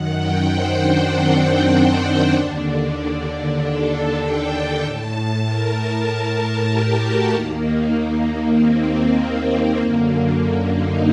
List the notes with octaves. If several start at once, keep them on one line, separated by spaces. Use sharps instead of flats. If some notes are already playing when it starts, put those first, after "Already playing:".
Already playing: F#2 D#3 F#5
G5
C5
D4
C4
D4
D#2 D3
D4
A4
G5
A2 A5
A#4
G4
F#4
D#2 D#3 A#3
A#3
C4
A#3
F#2 D3 A#3
D#4